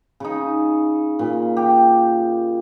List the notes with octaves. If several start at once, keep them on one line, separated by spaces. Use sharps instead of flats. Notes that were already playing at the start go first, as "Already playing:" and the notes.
C#3 D#4
A#2
G4